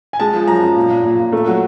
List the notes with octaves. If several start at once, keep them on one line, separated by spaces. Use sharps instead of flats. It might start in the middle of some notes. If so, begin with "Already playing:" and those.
G#5
G#3 A5
F3
F#2 A#5
F3
A#2
A#2
A#2
A#2
A3
F#3